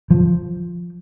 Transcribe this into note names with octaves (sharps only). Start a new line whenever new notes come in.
F3